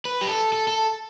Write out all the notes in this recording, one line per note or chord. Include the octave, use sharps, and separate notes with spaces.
B4
G4
A4
A4
A4